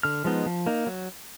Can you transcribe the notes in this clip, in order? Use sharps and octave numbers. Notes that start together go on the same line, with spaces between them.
D3 F6
F3 G#3 B3 D#4
F3
A#3 D#4
F#3